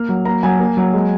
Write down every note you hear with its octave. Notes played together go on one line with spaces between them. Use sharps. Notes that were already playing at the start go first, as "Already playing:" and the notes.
Already playing: A#3 F6
F#3
A#3 A#5
F#3 G#5
A#3
F#3
G#3